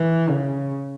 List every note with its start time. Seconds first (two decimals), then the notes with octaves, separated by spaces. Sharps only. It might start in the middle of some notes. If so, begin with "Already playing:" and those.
Already playing: E3
0.29 C#3